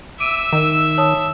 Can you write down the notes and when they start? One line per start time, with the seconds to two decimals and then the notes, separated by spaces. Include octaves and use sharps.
0.20 E5 D6 E6 D7 D#7
0.53 D#3
0.98 C#5 A5 D#6